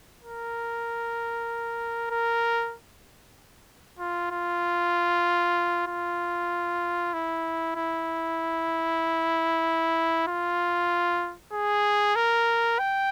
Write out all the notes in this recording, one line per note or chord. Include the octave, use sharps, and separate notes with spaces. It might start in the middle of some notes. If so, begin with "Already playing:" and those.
A#4
A#4
F4
F4
F4
E4
E4
F4
G#4
A#4
G5